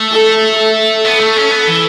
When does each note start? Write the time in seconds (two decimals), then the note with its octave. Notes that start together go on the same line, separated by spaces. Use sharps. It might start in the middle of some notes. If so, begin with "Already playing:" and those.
Already playing: A3
0.11 A4
0.58 A4
1.05 B3
1.20 A3
1.36 C#4
1.51 B3
1.67 E3